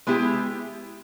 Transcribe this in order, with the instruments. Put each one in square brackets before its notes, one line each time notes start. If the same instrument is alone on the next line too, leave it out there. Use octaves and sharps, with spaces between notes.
[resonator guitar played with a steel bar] G#3 B3 E4 G4